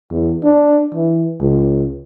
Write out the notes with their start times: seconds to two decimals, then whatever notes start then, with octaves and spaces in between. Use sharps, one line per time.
0.11 E2
0.44 D4
0.94 E3
1.41 C#2